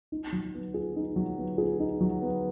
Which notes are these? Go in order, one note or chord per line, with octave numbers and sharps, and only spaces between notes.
D#4
F#3
B3
G#4
D#4
F#3
B3
G#4
D#4
F#3
B3